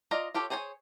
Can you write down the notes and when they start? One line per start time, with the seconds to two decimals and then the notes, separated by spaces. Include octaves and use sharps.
0.11 F4 D5 D#5 A#5
0.34 F4 G4 A4 C#5
0.50 G#4 C5 C#5 D#5 G#5